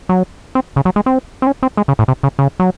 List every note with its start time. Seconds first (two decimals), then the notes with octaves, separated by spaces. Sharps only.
0.09 F#3
0.55 C4
0.76 C#3
0.85 F#3
0.96 G#3
1.06 C4
1.42 C4
1.47 C#4
1.63 C4
1.77 G#3
1.88 C#3
1.99 A2
2.08 C3
2.23 C#3
2.39 C#3
2.60 F#3